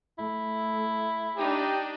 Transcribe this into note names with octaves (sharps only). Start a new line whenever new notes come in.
A3 E4
D4 D#4 G4